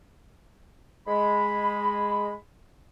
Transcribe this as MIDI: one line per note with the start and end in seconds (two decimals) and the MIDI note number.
1.07 2.33 56
1.07 2.33 83